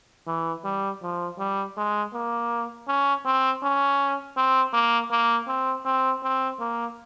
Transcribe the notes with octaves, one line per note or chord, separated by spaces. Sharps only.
E3
G3
F3
G3
G#3
A#3
C#4
C4
C#4
C4
A#3
A#3
C4
C4
C4
A#3